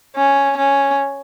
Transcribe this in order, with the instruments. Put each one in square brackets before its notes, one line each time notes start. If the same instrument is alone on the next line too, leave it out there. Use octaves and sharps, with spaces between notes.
[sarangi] C#4
C#4